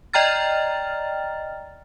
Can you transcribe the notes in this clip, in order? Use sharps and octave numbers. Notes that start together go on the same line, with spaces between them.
D5 D#5 G5 A#5 F6 A6